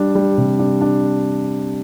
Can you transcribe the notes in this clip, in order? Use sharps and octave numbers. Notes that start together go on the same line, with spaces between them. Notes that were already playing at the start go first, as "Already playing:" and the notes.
Already playing: G3 D4
G3
C3
D4
D4